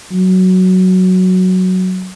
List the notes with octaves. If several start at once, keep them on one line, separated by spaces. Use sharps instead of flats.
F#3